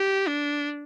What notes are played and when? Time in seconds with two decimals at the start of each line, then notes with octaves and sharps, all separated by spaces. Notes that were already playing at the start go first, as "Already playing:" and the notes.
Already playing: G4
0.27 D4